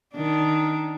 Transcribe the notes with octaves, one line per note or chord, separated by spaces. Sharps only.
D#3 D4